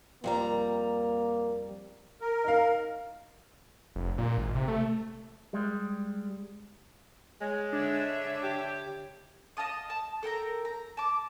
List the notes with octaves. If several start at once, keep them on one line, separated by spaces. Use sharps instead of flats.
F2 G3 A#3 A#5
A#4
D#4 F5
F1
A#2
G#1
C3
A3
G3 G#3
G#3 C#5
D3 D4 E5
G4
D#5 F5 A5 D#6
A5
A4 A#4 G5 A#5
A#5
A5 D6